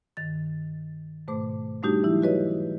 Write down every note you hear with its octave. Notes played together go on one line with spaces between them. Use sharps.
G2 D#3 A6
G#2 B2 A3 C5 D6
G3 A3 D4 D#4 F#4 G4
E3 F#3 E4 F#4
F#4 G4 B4 C#5 D#5